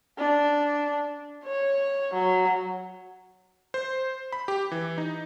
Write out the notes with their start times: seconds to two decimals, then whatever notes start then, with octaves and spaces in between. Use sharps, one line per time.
0.18 D4
1.44 C#5
2.14 F#3
3.74 C5
4.32 B5
4.48 G4
4.72 E3
4.98 D#4